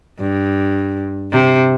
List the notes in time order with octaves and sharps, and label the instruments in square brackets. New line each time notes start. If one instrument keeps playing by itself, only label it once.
[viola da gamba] G2
C3